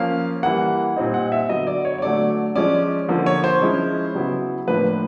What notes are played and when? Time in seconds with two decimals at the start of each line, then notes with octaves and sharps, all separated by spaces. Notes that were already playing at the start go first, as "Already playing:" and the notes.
Already playing: F3 A#3 C#4 F5
0.43 E3 G3 A#3 F#5
0.96 A#2 G3 C4 D#4
1.14 F#5
1.32 E5
1.49 D3 F#3 B3 D#5
1.67 D5
1.85 C#5
1.98 C#5
2.02 D3 F#3 A3 D5
2.55 F3 G#3 C#4 D5
3.09 D3 F3 A#3
3.26 C#5
3.44 C5
3.61 F3 G#3 C#4 E4
4.15 C#3 F#3 B3 E4
4.68 A2 F3 A#3 D4 B4